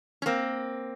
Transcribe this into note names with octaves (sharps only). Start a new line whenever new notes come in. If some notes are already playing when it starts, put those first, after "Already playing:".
C#4
A#3 C4